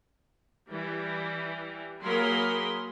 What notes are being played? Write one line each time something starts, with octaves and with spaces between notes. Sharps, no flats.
E3 G3
F#3 A#3 G#4 A#4 B5 C6